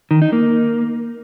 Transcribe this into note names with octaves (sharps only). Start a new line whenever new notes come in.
D#3
D#4
A#3